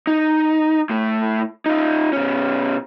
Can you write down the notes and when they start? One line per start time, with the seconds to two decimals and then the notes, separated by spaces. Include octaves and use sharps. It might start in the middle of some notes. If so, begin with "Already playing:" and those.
0.07 D#4
0.90 A2 A3
1.66 D#4 F4
2.13 B2 C#4